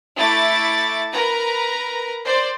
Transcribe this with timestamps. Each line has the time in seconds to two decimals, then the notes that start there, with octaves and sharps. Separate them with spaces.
0.16 A3 E4 D6 A6
1.12 A#4 B4 A#5
2.24 C5 D5